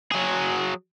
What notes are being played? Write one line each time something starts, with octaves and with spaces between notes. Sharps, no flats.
F#3 G#4